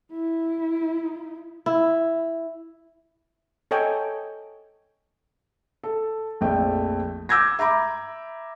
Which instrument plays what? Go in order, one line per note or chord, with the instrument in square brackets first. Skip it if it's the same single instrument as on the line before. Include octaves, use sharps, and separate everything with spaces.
[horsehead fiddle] E4
[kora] E4
[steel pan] A4 C#5 D#5 G5 G#5
[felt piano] A4
A#1 F2 A3 G5
D6 E6 G6 G#6 A#6
E5 A#5 B5 D6